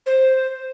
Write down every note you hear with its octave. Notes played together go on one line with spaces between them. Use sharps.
C5